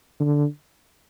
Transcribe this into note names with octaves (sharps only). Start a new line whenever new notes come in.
D3